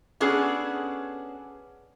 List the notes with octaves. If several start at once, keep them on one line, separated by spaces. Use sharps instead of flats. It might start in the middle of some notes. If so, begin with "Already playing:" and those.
B3 C#4 D4 F#4 G#4 A4